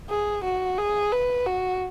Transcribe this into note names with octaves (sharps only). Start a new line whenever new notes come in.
G#4
F#4
G#4
B4
F#4